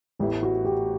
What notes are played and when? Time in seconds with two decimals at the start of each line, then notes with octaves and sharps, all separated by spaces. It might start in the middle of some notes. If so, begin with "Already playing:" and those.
0.19 A1 A2 E3 B3 E4 G4
0.43 F#4
0.65 G4